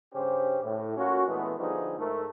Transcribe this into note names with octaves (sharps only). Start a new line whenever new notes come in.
G2 C#3 C#4 G4 C5
A2
A#3 C#4 F4 F#4
A#2 E3 G#3 A3 B3
D3 F3 G3 B3 D#4 G#4
G#2 A3 A#4